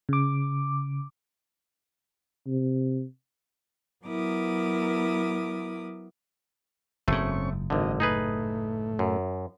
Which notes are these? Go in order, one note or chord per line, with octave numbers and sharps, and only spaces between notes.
C#3 D6
C3
F#3 B3 E4 A#4 D6 D#6
F#1 G#2 A3 C4 C#4 C#6
G#1 F#2 D3 D4 D#5
A2 A3 D#4 G#4 B4
F#2